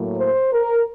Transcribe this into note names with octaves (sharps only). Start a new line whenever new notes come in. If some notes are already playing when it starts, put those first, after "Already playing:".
Already playing: A2 F#3 A#3
C5
A#4